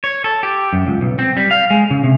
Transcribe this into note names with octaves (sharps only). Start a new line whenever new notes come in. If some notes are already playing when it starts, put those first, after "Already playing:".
C#5
A4
G4
F#2
C#2
B1
C4
G3
F5
G#3
C#3
C3